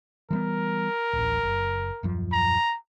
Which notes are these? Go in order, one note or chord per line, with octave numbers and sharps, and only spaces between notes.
E3 G3 B3 A#4
D1 A1
F#1
D#1 F#2 F3
A#5